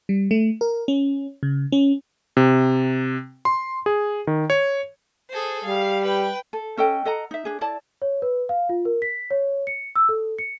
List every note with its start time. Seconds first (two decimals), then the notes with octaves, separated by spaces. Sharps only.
0.09 G3
0.31 A3
0.61 A#4
0.88 C#4
1.43 C#3
1.72 C#4
2.37 C3
3.45 C6
3.86 G#4
4.27 D#3
4.50 C#5
5.30 G#4 A4 C5
5.64 G3 F5
6.03 B4 G5
6.53 A4
6.77 C#4 A4 D#5 G5
7.05 A4 D#5 F#5 A#5
7.31 D#4 E5
7.45 D4 G#4
7.61 E4 D5 A5
8.02 C#5
8.22 B4
8.49 F5
8.69 F4
8.85 A#4
9.02 B6
9.31 C#5
9.67 C#7
9.96 E6
10.09 A4
10.39 C#7